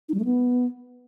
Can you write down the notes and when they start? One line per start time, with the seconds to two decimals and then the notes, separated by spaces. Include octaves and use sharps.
0.09 D#4
0.14 G3
0.19 A3
0.25 B3